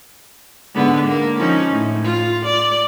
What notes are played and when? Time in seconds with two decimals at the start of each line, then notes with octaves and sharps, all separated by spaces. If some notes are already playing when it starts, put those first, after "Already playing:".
0.75 G#2 D3 B3
1.08 A#3
1.39 F3 C#4 D#4
1.71 A2
2.04 F4
2.45 D5